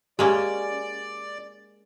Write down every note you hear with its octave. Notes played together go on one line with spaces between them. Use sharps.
G#3 A#3 C#4 G4 D5 G#5